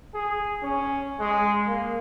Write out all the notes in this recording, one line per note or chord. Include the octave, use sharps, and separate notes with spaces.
G#4
C#4
G#3
A#3